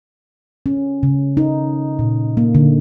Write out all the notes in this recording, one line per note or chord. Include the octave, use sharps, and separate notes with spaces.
C#4
C#3
D#4
A#2
A#3
D3